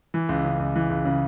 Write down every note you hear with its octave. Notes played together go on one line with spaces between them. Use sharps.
E3
C#2
C#3
C#2
E3
C#2
C#3